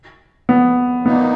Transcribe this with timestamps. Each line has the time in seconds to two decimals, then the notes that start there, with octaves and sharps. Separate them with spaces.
0.49 B3
1.05 A#2 A#3 B3 D#4